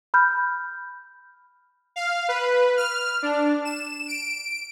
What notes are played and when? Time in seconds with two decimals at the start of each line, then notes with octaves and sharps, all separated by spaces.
0.14 B5 F6 G6
1.96 F5
2.28 B4
2.77 F6
3.22 D4
3.65 E7
4.08 D7